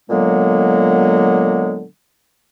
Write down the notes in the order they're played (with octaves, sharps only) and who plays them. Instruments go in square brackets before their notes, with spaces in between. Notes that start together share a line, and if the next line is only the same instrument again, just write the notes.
[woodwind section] A#2 D3 F#3 G#3 A#3 B3